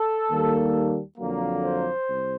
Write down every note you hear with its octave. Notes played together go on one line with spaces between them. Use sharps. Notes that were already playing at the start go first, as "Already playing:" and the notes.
Already playing: A4
D#2 D#3 G3 A#3
F2 D3 F#3 A#3
C5
C2